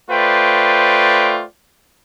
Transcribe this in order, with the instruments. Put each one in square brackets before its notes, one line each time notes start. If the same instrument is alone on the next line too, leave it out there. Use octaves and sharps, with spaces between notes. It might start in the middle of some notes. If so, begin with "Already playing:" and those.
[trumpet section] A3 F4 B4 C5 D5 G5